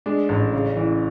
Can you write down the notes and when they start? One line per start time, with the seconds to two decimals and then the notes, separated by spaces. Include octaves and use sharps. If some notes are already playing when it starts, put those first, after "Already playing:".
0.06 G#3 D4
0.29 A1
0.53 C#3
0.76 E3